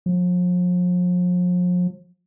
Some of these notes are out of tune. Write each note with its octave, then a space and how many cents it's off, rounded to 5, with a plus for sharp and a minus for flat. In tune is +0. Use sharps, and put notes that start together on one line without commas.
F3 +40